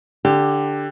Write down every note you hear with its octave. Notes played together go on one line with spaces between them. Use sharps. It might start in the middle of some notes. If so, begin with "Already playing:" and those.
D3 G4